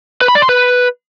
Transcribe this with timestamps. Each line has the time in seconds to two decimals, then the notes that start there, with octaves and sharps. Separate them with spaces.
0.21 B4
0.28 B5
0.35 D5
0.42 C6
0.49 B4